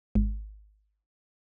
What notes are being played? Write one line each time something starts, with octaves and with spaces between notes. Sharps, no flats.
G#1